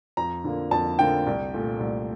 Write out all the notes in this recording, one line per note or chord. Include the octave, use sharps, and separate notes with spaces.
F2 A#5
D3 F3 A#3
F2 A5
D3 F3 A#3 G5
C2
A#2 A3
C2